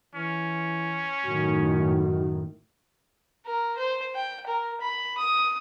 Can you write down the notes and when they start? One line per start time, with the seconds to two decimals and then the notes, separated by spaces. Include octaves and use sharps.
0.15 E3 C#4
1.26 F#2 A2 D#3 F#4
3.46 A#4
3.78 C5
4.15 G5
4.46 A#4
4.81 B5
5.18 D#6